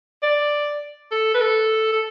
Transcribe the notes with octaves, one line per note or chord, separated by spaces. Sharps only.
D5
A4
B4
A4
A4